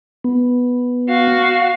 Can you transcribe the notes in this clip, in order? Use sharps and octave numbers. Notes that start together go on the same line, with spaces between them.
B3
F#4 F5